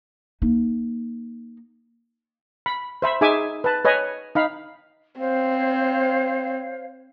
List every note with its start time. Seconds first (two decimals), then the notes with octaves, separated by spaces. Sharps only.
0.42 A#3 D#4
2.66 B5
3.02 C5 E5 B5
3.21 D#4 G#4 E5 G#5 D6
3.64 B4 A5
3.85 B4 C#5 D#5 G#5
4.35 D#4 F5 B5
5.20 C4 C5 C#5 F5